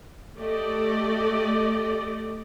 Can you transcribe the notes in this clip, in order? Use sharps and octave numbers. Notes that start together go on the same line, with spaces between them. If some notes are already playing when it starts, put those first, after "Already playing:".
A3 G4 A4 D5 D#5